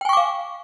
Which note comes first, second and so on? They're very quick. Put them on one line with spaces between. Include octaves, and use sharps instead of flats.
G5 G#5 C#6 D6 F5